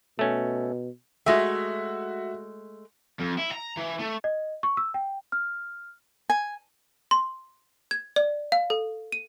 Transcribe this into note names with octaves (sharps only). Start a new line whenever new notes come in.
B2 A3 C#4
G#3 A3 F#4 E5
F2
E4
A#5
E3
A3
D#5
C#6
E6
G5
F6
G#5
C6
G#6
D5
F5
A4
D#7